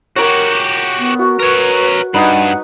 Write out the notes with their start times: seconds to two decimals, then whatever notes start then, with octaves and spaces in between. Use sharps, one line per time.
0.16 F#4 G4 A#4 C#5
0.99 B3
1.19 F#4
1.39 A#4 B4 C#5
2.14 G2 D#4 B4 F#5